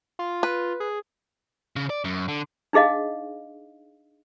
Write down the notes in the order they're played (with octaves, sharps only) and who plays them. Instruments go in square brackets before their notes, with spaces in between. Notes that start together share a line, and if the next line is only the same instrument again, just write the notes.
[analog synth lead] F4
[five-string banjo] B4
[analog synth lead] G#4
[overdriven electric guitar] C#3
D5
F#2
D3
[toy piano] D4 D#4 G#4 D#5 F5